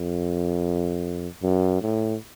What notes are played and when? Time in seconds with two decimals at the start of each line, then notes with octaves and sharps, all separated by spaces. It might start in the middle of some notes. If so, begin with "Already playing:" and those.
Already playing: F2
1.42 F#2
1.81 A2